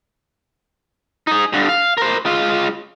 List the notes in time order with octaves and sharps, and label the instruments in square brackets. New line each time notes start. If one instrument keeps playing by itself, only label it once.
[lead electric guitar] D#4 G#4
G2 D3
F5
A#4 C5
G#3 F4